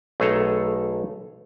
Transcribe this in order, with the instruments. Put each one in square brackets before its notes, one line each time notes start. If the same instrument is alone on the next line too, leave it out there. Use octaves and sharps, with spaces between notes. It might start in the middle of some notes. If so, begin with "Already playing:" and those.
[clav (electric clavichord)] B1 A3 G#4 A4 A#5